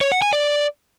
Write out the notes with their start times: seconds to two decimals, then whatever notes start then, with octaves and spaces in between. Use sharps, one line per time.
0.01 C#5
0.12 F#5
0.22 G#5
0.33 D5